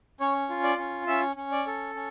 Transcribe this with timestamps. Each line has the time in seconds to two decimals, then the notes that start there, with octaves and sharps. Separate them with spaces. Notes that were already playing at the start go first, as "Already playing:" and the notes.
0.20 C#4 C#5
0.50 F4
0.63 D5
0.78 C#4
1.07 C#4 E5
1.36 C#4
1.52 D5
1.67 A4
1.95 C#4